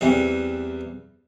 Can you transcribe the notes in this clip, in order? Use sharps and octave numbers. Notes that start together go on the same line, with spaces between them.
E2 E3 G3 C4